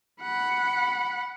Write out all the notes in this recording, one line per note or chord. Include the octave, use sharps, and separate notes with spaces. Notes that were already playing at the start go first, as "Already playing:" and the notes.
F#5 B5